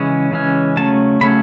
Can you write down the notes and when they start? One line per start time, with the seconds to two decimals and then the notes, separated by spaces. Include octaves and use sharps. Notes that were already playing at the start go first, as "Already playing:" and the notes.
Already playing: C#3 E3 G#3 C#4
0.31 C#3 E3 G#3 C#4
0.77 C#3 F#3 A3 C#4 A5
1.21 C#3 F#3 A3 C#4 B5